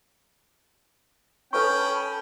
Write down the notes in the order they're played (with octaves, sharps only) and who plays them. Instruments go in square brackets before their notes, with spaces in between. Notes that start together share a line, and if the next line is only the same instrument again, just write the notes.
[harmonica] C#4 G5 [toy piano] A4 B4 C#6 [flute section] A5 B5